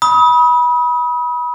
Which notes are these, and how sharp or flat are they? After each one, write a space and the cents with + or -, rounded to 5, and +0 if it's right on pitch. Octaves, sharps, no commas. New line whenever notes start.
B5 -25 D#6 +30